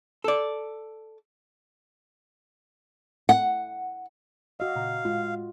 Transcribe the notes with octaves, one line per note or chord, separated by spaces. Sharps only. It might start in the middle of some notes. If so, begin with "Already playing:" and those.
A4 D5
F#5
F#4 D#5 F5 E6
A#2 C#3 A#5
A2 G#3 F4